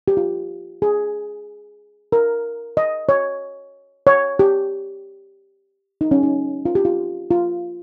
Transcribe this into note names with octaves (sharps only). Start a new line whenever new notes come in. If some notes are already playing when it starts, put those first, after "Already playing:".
G4
F4
G#4
A#4
D#5
C#5
C#5
G4
D#4
C#4
D#4
F4
G4
F4
F4